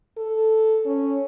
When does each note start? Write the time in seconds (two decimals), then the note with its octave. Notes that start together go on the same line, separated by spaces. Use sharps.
0.17 A4
0.86 C#4